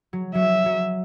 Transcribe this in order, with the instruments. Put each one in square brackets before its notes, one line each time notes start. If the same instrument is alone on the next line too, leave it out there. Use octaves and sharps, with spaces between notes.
[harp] F#3
[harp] F#3 [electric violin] E5
[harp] F#3